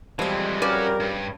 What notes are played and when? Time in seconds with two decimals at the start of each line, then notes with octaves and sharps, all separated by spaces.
0.19 F2 E3 F3 G3 G#3 C4
0.62 C#3 C#4 F#4 A#4 B4 D5
1.00 G2